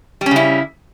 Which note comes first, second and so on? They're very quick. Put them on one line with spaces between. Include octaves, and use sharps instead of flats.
G3 C#4 C#3 E4